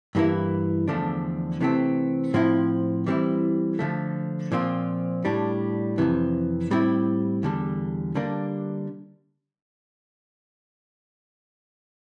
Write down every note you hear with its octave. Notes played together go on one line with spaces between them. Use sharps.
G2 E3 A#3 E4
E2 D3 F3 A3 D4
C3 E3 A3 C4
A2 F3 C4 E4
E3 G3 C4 E4
D3 F3 A3
A#2 F3 C4 F4
A2 G3 D4
F2 C3 E3
A2 G3 C4 E4
E2 D3 G3
D3 G3 A#3 D4